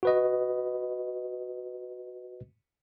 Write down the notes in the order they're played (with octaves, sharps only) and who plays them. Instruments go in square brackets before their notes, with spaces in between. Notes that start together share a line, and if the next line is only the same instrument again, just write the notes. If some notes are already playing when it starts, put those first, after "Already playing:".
[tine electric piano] F#4 B4 D#5